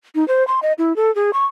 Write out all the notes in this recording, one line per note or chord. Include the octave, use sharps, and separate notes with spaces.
D#4
C5
C6
D#5
E4
A4
G#4
C#6